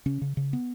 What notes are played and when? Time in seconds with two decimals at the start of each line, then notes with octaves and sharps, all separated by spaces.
0.06 C#3 C#4
0.22 C#3
0.37 C#3
0.53 B3